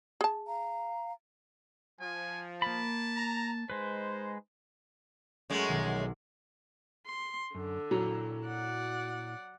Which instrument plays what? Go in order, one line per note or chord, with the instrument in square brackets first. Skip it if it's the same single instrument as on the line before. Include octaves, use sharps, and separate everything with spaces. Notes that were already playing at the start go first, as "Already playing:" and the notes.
[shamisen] G#4 A5
[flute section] F5 A#5
[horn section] F3 [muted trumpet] G#5
[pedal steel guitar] A#3 B5 [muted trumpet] A5
[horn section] A#5
[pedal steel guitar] G#3 B4 [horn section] D#4 C5
[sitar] F#2 G#3 A3
[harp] B1 D#3
[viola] C6
[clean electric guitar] F#2 [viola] D3
[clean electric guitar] A#2 E4 A#5 [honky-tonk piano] F#3
[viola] D5 F#5